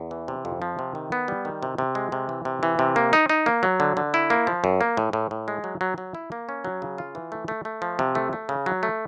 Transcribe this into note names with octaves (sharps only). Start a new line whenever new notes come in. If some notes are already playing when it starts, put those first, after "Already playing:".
Already playing: E2
E3
C3
F2
F3
C3
D#3
B3
G3
D#3
C3
C3
G#3
C3
E3
C3
E3
C3
A#3
D#4
D#4
A#3
F#3
D3
D3
E4
A#3
F3
F#2
A#3
A2
A2
A2
G#3
F#3
F#3
F#3
E4
A#3
C#4
F#3
C#3
F4
E3
A3
A3
A3
F3
C3
A3
A3
C#3
F#3
A3